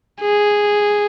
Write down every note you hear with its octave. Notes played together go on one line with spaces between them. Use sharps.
G#4